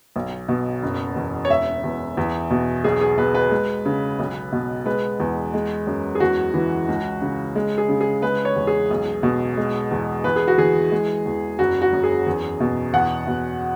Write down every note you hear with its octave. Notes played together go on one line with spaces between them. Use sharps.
B1
B2
F#1
E2
C#5
E1 E5
E2
E2
B2
B1 G#4
G#4
B2 B4
B4
G#3
C#3
B1
B2
G#3 B4
E2
G#3
F#2
G#4
E2 F#4
E3
C#2
C#3
G#3
G#4
C#3
G#4
G#3 B4
C#5
E2
G#4
B1
B2
G#3
E2
E2 B4
G#4
F#4
E3 G#4
G#3
E2
F#1 F#4
F#4
F#2
G#4
E2
B2
E2 F#5
B2